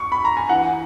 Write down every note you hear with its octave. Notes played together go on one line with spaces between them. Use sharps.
C#6
B5
A#5
G#5
E3 F#5